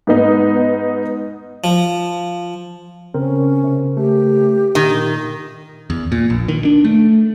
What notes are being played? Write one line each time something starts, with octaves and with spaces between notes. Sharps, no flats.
G#2 B3 D#4
F3
C#3 C4 C#4 A#4 C5
C3
A3 G4
A#2 D#3
E2
A#2
A#1
D#3
D4
A3